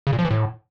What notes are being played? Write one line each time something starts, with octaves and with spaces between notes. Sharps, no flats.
C#3
A#2
F3
E3
A2